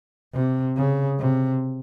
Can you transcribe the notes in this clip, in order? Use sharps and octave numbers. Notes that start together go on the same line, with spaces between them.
C3
C#3
C3